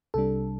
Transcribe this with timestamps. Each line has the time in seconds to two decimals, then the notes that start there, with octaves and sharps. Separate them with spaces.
0.14 C2 C3 G3 D4 A4